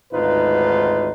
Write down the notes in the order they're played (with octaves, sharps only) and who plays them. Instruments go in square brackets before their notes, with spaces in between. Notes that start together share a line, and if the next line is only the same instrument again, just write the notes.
[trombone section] G#1 D2 G#2 D#4 F4 B4